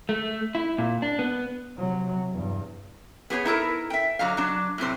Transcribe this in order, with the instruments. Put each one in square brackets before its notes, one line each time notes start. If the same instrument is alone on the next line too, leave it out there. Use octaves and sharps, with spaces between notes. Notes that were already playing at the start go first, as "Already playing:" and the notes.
[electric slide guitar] A3
E4
A#2
D4
B3
[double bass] C3 F#3
E2 G2
[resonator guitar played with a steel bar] B3 G#4 B4 C#5
D#4 E4 A4 A#4
E5 G5
D3 F#3 D#4 F5
F#3 D4
A2 C3 F#3 C5